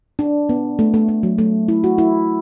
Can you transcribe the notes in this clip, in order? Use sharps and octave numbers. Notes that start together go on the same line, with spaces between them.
D4
B3
A3
A3
A3
F#3
A3
E4
F#4
E4